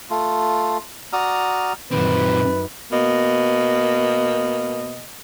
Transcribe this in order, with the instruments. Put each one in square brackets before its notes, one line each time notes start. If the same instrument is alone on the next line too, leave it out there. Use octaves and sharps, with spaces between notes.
[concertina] A3 F4
F#4 D5 A#5 D#6 F6
[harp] F#2 D#3 [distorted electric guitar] A#2 C4 [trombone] B4
[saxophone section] B2 A#3 D#5